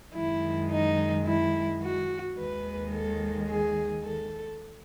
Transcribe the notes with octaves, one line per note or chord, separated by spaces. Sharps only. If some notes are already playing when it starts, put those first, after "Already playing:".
F#2 D#3 G#3 E4
D#4
E4
F#4
D#2 D#3 G#3 B4
A4
G#4
A4